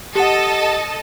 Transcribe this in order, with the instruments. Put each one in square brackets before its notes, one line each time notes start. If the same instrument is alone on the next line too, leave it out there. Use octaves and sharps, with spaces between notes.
[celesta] G4 F#5 [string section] A4 A5 [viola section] D#5